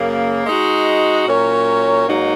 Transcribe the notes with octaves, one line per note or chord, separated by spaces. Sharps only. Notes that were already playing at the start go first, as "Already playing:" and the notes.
Already playing: F#2 C#3 A#3
G#3 D#4 F#4
A#2 F#3 C#4 A#4 C#5
G#2 F#3 A#3 D#4 F#4